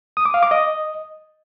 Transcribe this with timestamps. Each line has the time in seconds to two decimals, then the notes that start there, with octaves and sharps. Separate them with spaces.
0.17 D#6
0.25 D6
0.34 F5
0.43 D6
0.51 D#5